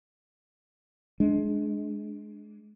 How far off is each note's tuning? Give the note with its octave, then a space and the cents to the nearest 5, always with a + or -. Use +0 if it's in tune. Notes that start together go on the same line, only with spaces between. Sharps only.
G#3 +20 D4 +0